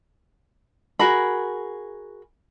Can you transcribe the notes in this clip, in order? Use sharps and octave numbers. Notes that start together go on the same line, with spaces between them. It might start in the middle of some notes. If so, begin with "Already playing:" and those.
F#4 G#4 A#4 B5